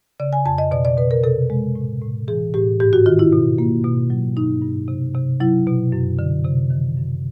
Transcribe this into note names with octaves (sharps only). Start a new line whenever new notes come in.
C#3 D5
G#5
F2 A5
D#5
B2 D5
D5
B2 B4
A#4
C3 A4
G#3
A2
A2
E3 G#4
A2 G4
G#2 G4
F#4
D#3 F4
E4
B2
A#3
B2
F#3
G2 D#4
G2
C3
C3
F#3 E4
B2
F#2
D3
C3
D#3
F#2